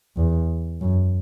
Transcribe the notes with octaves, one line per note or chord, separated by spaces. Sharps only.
E2
F#2